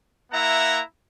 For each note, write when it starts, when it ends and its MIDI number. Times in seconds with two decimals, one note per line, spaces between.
0.32 0.82 58
0.32 0.82 64
0.32 0.82 76
0.32 0.82 78
0.32 0.82 82